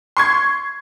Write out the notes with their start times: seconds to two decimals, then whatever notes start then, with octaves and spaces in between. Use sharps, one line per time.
0.17 C6 C#6 G#6